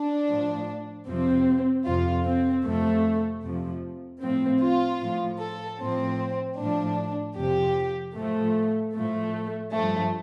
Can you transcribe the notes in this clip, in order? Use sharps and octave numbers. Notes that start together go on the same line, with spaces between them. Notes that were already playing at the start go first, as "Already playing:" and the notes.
Already playing: D4
A2 F3
F2 C3 F3 C4
F2 C3 F3 F4
C4
F2 C3 F3 A3
F2 C3 F3
A2 F3 C4
F4
A2 F3
A4
A2 F3 C4
A2 F3 D4
F2 C3 F3 G4
A2 F3 A3
A2 F3 A3
G2 F3 A3